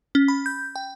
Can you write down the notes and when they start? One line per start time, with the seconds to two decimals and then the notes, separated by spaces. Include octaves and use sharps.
0.15 C#4
0.28 B5
0.46 G6
0.76 G5